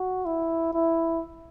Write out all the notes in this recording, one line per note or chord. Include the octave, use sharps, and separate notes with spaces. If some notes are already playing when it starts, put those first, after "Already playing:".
Already playing: F#4
E4
E4